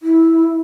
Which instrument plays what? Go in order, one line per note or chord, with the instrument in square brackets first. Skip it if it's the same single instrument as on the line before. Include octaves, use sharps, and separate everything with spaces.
[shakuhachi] E4